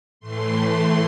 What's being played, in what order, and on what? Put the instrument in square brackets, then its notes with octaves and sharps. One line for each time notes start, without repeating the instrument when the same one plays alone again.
[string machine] A2 E3 A3 C6